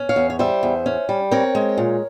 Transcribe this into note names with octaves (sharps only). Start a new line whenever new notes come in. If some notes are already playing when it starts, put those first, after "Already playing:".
Already playing: C#4
C#5 F5
E2
C#5
G3 C5 E5
E2
C#4
G3
C4 A#4 C#5
G#3
A#2